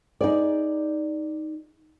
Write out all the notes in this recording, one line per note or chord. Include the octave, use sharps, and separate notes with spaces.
D#4 G#4 D5